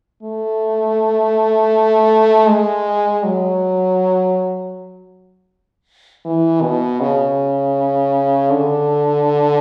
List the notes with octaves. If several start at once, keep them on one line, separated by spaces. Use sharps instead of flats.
A3
G#3
F#3
E3
B2
C#3
D3